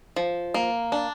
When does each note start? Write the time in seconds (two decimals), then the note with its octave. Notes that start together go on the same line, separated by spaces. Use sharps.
0.16 F3
0.54 A#3
0.92 D4